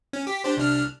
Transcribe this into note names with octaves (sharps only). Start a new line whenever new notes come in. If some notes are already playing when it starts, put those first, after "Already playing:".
C#4
G4 B6
D4 G4 C5
C2 D4 F6